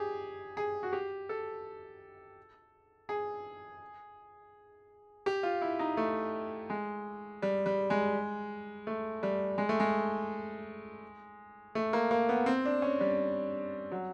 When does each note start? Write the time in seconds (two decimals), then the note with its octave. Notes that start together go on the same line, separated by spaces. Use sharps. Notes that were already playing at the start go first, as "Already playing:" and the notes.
Already playing: G4 G#4
0.57 G#4
0.83 F#4
0.93 G4
1.29 A4
3.09 G#4
5.26 G4
5.43 F4
5.62 E4
5.79 D#4
5.97 A3
6.70 G#3
7.42 G3
7.66 G3
7.90 G#3
8.87 A3
9.23 G3
9.58 G#3
9.69 A3
9.80 G#3
11.75 A3
11.93 A#3
12.11 A#3
12.29 B3
12.46 C4
12.65 D4
12.82 C#4
13.00 G3
13.92 F#3